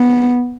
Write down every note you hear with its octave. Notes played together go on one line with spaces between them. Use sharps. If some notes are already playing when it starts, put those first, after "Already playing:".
Already playing: B3